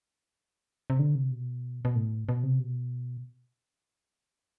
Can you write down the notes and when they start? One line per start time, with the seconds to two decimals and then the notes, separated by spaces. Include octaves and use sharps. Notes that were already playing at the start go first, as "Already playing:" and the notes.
0.90 C3
0.99 D3
1.15 C3
1.31 B2
1.85 B2
1.96 A2
2.29 B2
2.43 C3
2.60 B2